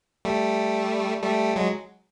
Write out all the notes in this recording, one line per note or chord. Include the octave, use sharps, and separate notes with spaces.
G3 A3
G3 A3
F#3 G#3